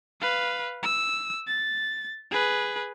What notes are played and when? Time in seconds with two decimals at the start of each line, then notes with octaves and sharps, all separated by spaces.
0.21 B4 F5
0.83 E6
1.47 A6
2.31 G#4 B4